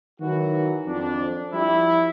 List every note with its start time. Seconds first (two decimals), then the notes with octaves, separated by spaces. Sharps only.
0.20 D#3 E3 F#3 F#4
0.87 F2 D4
1.54 F3 G3 E4